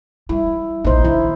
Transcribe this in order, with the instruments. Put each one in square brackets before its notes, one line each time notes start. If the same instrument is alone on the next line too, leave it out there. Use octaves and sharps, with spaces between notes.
[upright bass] G3 [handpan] E4
[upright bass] A#1 A#3 [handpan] D#4 C5
[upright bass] D#3 D4 [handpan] E4